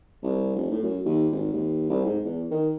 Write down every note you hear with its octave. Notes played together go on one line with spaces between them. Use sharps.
C2
F1
A2
F#2
D#2
G#1
D#2
C2
G#2
E2
D#3